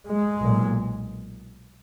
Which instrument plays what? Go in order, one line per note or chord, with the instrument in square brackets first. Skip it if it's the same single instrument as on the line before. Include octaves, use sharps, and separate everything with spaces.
[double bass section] G#3
B1 A#2